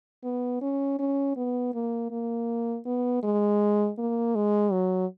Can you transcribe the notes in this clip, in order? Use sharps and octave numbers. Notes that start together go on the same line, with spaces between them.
B3
C#4
C#4
B3
A#3
A#3
B3
G#3
A#3
G#3
F#3